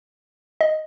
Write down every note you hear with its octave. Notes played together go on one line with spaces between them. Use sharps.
D#5